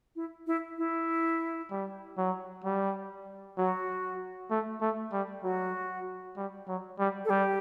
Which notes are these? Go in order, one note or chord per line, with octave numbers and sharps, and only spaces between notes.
E4
E4
E4
G3
F#3
G3
F#3 F#4
A3
A3
G3
F#3 F#4
G3
F#3
G3
A4
G3 G4